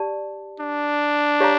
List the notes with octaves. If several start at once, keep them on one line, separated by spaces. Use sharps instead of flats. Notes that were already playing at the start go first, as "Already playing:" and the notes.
Already playing: G4 D5 A5
D4
G4 C#5 F5 A#5